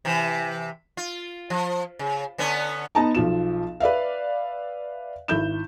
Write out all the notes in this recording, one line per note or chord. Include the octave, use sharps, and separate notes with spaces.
C3 E3
F4
F3
C#3
D3 B3 C#4
B3 D#4 A5 A#5
B1 F3 F4 E7
B4 D5 E5 F5
G#1 E4 G6 E7